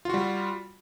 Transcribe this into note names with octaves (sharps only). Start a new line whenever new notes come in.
G3 F4 F#4